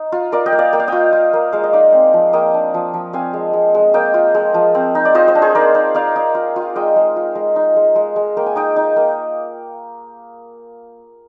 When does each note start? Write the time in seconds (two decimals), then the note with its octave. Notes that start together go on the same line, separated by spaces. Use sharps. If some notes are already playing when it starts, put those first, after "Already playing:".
Already playing: D#4
0.12 F4
0.32 F4 A#4 D5
0.46 D#5 G5
0.52 A#3
0.59 D5 F5
0.73 A#3 G5
0.80 F5
0.87 F4 D#5 G5
1.13 F4
1.33 A#3
1.52 G#3 F5
1.64 D#5
1.73 D#4 D5 F5
1.93 C4
2.14 F3
2.33 A#3 D#5 G5
2.54 D4
2.74 F3
2.94 F3
3.13 C4 F5 G#5
3.33 G#3
3.53 G#3
3.75 G#3
3.94 A#3 D#5 G5
4.14 F4
4.35 G#3
4.54 F3
4.75 C4
4.95 D#4
5.05 D5
5.15 F4 C5 D#5
5.28 C5 D#5
5.35 D4
5.42 G#4 C5
5.55 D#4 A#4 D5
5.75 D#4
5.95 D#4 D5 F5
6.16 D#4
6.35 F4
6.56 F4
6.76 G#3 D#5 G5
6.96 G#3
7.16 F4
7.35 G#3
7.56 D#4
7.76 G#3
7.96 G#3
8.16 G#3
8.37 A#3 G5
8.46 G#5
8.56 D#4 D#5 G5
8.76 D#4
8.96 A#3